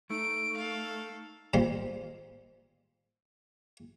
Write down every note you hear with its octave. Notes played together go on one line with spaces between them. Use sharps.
A3 D#4 D7
A4 F5
A#2 D#3 G3 C5 C6